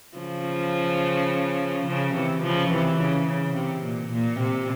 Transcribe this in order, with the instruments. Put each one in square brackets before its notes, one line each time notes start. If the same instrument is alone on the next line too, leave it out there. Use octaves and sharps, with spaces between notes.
[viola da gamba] C#3 F3
C#3 F3
C3 E3
C#3 F3
C3 E3
C#3
C#3
C3
A#2
A#2
C3